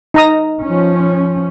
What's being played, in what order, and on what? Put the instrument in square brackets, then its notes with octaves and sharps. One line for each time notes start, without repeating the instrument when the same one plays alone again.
[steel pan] D#4 A#5 D#6
[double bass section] F3 C#4